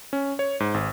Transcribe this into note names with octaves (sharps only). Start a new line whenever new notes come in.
C#4
C#5
G#2
G#1